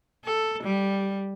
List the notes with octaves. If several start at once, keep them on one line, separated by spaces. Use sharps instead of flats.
A4
G3